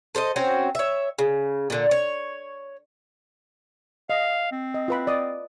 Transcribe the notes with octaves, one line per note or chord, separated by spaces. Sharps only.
A4 C5 D5 D#5
C4 C#4 F#4 C5
C#5 E5
C#3
A#2 D3
C#5
D#5 F5
C4
D#5
F4 B4 B5
D5 D#5 D#6